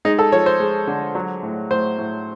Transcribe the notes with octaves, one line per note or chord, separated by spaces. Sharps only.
G#3 D#4
A4
F3 C#5
C5
G#3
D3
F#3
A2
A2 C5
A2